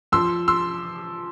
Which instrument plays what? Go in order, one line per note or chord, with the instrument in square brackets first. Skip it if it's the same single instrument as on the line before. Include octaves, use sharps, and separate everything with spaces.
[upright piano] F3 C6 E6
C6 E6